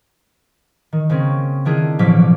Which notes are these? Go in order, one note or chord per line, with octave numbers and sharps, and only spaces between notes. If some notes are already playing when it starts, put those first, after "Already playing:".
D#3
C#3 A#3 C4 C#4
D#3 A3 D4 E4 F4 G#4
A1 B2 F3 F#3 D6 B6